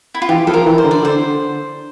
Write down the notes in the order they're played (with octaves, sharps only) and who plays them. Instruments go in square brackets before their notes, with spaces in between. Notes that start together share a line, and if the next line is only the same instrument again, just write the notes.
[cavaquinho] E4
F4
[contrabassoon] E3 [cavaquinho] G4
[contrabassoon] F3 [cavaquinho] A4
[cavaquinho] A#4
[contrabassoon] E3
[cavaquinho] C5
[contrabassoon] D3
[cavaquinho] D5
[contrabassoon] D3 [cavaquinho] C5